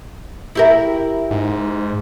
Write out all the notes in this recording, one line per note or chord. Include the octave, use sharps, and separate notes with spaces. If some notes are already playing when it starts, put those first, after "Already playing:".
E4 G4 A#4
G#2